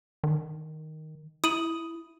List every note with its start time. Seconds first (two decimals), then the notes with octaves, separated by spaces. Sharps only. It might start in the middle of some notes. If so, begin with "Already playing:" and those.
0.24 D#3
1.44 E4 D#6 D#7 F#7